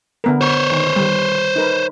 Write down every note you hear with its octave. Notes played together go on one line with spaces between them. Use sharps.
D3 B3 A#4
C5 C#5
D#3
D#3 G3
D#4 A#4 B4